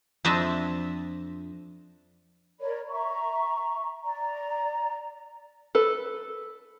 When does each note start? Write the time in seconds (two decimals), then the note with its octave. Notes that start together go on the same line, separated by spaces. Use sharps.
0.25 F2 C4 D4 D#5 E5 A5
2.60 A#4 C#5 D5 B5
2.88 E5 A#5 C#6
4.03 D5 A#5
5.75 A4 B4